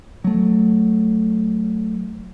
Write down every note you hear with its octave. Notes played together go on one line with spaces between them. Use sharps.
F#3 A3